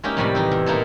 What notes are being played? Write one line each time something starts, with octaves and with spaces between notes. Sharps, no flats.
G#3 A#3 C#4 D#4 E4 G4
F2 A2 C3 G3 D5 B5
E3 D#4 E4
E2
A#2 A#3 D#4 E4 A4